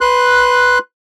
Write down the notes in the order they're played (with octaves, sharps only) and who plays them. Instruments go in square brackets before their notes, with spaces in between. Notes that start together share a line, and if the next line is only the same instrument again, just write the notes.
[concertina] B4 C6 F#6